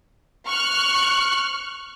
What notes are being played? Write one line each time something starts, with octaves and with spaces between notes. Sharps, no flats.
C#6 F6 F#6